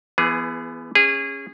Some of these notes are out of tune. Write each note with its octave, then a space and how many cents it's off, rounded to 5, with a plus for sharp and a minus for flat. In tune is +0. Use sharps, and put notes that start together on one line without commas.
E3 +30 B3 +0 G#4 +0
C#4 +0 G#4 -25